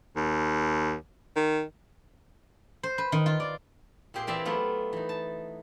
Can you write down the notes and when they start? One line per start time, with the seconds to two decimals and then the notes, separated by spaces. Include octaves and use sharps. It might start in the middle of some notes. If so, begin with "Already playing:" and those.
0.16 D#2
1.36 D#3
2.83 C5
2.98 B4
3.12 D#3
3.26 F4
3.40 D5
4.14 A#2 C4 G4 G#4 C6
4.27 E3 C4 D5 E5 F5
4.45 F#3 A3 B3 F4
4.93 E3 D#4
5.09 A5